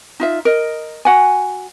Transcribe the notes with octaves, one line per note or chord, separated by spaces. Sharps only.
D#4 F4 E5
A#4 D#5
F#4 F#5 G#5